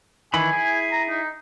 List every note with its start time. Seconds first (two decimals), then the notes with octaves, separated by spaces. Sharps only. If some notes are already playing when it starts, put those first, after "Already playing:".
0.34 D#3 E3 G#5 B5
0.53 E4 G#4
0.92 A#5
1.10 D#4